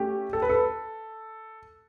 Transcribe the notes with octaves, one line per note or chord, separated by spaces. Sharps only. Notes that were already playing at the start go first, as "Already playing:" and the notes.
Already playing: A3 C#4 G4
A4
B4
A4